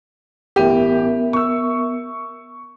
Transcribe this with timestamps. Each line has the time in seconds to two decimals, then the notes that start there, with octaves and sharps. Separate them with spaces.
0.56 A1 B3 G4 A#4 E5
1.33 C#6 E6